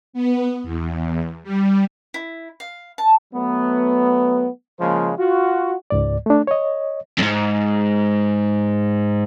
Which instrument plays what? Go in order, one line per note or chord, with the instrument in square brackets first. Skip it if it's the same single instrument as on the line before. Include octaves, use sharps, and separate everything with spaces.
[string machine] B3
E2
G3
[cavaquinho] E4
F5
A5
[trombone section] F#3 A3 B3
C#3 F3 G#3 A#3 C5
F4 F#4
[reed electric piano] C#2 G#2 D5
A3 D4
C#5 D#5
[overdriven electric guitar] F2 G#2